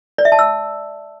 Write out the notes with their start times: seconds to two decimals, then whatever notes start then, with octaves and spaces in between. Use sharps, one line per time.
0.18 D5
0.25 E5
0.32 A5
0.39 E6